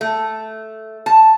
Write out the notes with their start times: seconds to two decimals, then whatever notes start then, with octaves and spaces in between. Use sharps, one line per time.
0.01 A3
1.06 A5